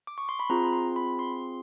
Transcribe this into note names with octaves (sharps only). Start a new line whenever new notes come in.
D6
C#6
C6
B5
C4 F4 G#4 A#5
C6
B5
C6